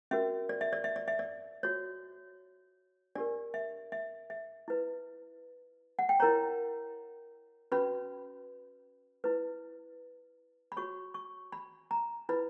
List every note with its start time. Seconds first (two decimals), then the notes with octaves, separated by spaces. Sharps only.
0.11 C#4 F#4 A#4 E5
0.49 D5
0.61 E5
0.73 D5
0.84 E5
0.96 D5
1.08 E5
1.19 D5
1.63 F#4 C#5
3.15 D4 G4 A#4 D5
3.54 E5
3.92 E5
4.30 E5
4.68 E4 B4
5.99 F#5
6.09 G5
6.20 E4 A#4 C#5 A#5
7.72 C#4 F#4 B4 B5
9.24 E4 B4
10.72 B5
10.77 F#4 C#5 C#6
11.14 C#6
11.52 B5
11.91 A#5
12.29 E4 B4 B5